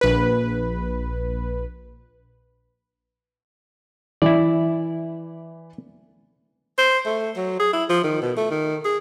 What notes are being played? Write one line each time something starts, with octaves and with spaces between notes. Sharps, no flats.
A#1 B4
E3 E4 D5
C5
A3
F#3
G#4
E4
F3
D#3
B2
A3
D#3
G#4